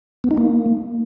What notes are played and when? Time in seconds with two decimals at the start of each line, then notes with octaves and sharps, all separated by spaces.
0.24 B3
0.31 D#4
0.37 A#3